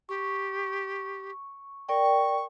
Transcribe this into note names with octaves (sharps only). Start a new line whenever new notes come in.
G4 C#6
A#4 D5 G5 C#6